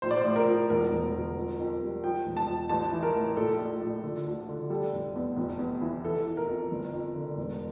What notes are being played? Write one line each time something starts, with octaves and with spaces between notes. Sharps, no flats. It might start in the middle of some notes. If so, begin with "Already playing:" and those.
A#1 C5
D5
C5
A2
A#4
F3
E1 A#4
E1
D2
F2
F2
G3
F3 G5
E1
A5
F3
A1 A5
E3
A#4
A2
A#1 A4
A2
A#1
D3
D2
D3
G3 A4
F1
E2
F1
E2
E3
E3 A4
E3
A#4
F2
G1
F2
D3
E1